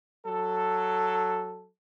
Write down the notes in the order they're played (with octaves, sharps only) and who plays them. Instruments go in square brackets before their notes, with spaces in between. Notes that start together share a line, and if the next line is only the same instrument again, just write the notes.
[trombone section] F#3 A4